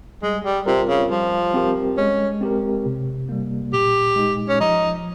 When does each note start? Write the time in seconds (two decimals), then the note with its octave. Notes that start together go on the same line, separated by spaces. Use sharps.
0.23 G3 G#3
0.45 G3
0.66 C3 C4 F4 A#4
0.89 C#3
1.10 F3 G3
1.54 C4 G4 A#4
1.97 G#3 C#4
2.41 C4 G4 A#4
2.86 C3
3.29 G3 A#3
3.73 A#2 G4
4.16 G#3 D#4
4.49 C#4
4.60 F3 D#4